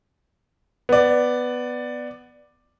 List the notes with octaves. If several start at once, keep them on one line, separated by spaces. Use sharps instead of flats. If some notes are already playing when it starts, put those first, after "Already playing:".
B3 D5